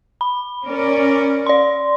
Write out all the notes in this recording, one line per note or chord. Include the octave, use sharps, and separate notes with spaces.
B5
C#4 A#4 D5
D5 C6